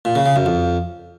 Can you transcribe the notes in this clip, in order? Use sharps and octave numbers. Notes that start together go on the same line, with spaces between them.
A#2
C#3
C#3
F#2
F2